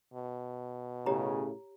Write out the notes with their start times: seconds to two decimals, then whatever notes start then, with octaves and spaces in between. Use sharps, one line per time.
0.14 B2
1.06 A2 C#3 G4 C#5 A#5